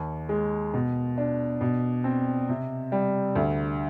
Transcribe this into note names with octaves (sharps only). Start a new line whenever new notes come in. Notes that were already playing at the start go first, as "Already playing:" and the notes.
Already playing: D#2
G#3
B2
D4
B2
C4
C3
G3
D2